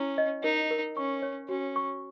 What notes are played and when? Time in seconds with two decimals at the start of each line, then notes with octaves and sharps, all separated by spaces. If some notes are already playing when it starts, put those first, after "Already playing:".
Already playing: C#4 E4
0.18 D#5
0.43 D#4 A#4
0.71 A#4
0.97 C#4 C#6
1.22 C#5
1.49 C#4 F#4
1.76 C#6